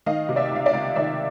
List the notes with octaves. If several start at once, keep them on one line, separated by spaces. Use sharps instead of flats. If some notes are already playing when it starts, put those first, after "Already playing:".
D#3 D#5 F5
C3
D5 E5
C#2 F5
D5 E5
C#2
D#3 D5 E5